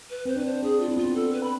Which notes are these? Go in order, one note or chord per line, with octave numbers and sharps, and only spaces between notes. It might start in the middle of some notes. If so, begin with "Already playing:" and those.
B4
C4 C5
D4 B4
C5
D4 G#4
F4
C4 E4
B3 F4
C4
A4
B4
B5